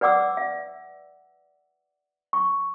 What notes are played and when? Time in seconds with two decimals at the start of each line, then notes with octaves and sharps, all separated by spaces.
0.01 B4 D5 F#5 D6 E6
0.37 E5
2.33 C#6